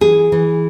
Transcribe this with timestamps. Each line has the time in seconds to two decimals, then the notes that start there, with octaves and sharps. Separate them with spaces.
0.01 E3 G#4
0.32 E3